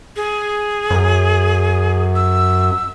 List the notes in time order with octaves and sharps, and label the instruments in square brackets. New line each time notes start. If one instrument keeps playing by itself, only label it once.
[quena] G#4
[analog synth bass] F#2
[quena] E6